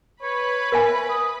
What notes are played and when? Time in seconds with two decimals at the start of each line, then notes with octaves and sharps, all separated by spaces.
0.22 B4 C#5 B5
0.72 A#4 E5 G#5
1.09 D#6